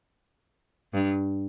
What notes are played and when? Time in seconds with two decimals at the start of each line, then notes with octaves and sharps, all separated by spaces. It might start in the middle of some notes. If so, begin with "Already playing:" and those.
0.94 G2